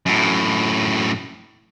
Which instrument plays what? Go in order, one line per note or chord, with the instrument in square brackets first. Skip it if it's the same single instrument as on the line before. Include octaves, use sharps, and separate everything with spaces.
[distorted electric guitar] F#2 A2